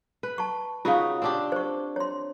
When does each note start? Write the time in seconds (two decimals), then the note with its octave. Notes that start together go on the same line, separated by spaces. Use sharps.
0.23 B4
0.38 A5 C#6
0.85 C#3 D#4 F4 F#4 F5
1.22 C4 D4 G4
1.52 C5 C#6
1.96 C#5 C6